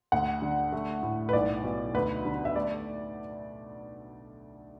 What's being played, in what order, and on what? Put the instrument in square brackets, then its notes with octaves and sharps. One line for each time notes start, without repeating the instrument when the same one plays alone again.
[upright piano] D2 F#5
D3
A3
A2
B4
B1 D5
B2
D2 B4
D3
E5
A3 D5